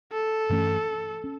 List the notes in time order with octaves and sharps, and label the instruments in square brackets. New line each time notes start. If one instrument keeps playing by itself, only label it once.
[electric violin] A4
[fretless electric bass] G2 E3 A3 C#4
C#4